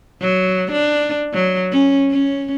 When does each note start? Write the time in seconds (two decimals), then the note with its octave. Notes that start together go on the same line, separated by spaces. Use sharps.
0.21 F#3
0.72 D4
1.33 F#3
1.72 C#4
2.11 C#4